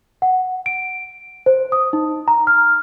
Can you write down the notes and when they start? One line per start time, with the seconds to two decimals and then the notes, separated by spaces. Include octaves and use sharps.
0.22 F#5
0.66 D7
1.46 C5
1.72 D#6
1.93 D#4
2.28 A#5
2.47 F6